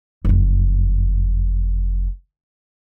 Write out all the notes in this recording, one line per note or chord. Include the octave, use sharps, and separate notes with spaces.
F#1 F2